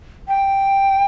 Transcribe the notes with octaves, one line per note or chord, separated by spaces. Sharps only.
G5